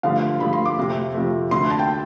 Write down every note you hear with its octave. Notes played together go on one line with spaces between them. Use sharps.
G2 D3 F3 A3 F5
G2 D3 F3 A3 B5
C6
D6
F2 C3 F3 A3
F2 C3 F3 A3
D2 D3 A3 C6
B5
A5
G5